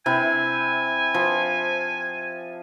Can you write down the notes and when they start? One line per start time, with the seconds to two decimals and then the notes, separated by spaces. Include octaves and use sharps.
0.06 C3 E4 G#5
1.14 F3